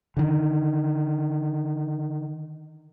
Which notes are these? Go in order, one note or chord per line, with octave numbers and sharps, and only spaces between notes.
D3 D#3